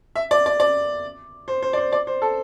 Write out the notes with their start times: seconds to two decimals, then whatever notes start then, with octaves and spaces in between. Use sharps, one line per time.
0.15 E5
0.31 D5
0.46 D5
0.60 D5
1.48 C5
1.62 C5
1.73 D5
1.77 C5
1.92 D5
2.07 C5
2.22 A4